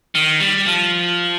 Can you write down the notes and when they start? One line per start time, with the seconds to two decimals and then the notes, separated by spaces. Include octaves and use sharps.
0.15 D#3
0.40 G3
0.66 F3